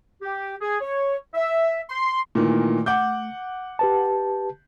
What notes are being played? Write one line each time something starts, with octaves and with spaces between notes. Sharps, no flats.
G4
G#4
C#5
E5
C6
A#2 D#3 E3 A3
F#5 D6 G6
G4 B4 A5